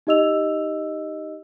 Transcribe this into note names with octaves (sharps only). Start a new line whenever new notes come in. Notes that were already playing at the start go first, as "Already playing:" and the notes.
D#4 G4 D#5 E6 F7